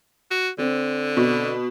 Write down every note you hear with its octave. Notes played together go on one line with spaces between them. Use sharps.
F#4
D3 C4
B2